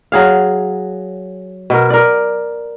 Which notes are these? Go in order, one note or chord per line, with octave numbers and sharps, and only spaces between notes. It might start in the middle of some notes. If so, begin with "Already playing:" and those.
F#3 G#4 F5
B2 A#4
A#4 D5